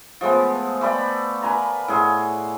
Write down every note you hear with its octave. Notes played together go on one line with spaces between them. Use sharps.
F3 G#3 A3 B3
A3 B4 D5 G5
A#4 B4 G#5 A#5
A2 G#4 F#5 C6